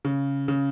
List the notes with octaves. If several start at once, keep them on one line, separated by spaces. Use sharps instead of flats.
C#3
C#3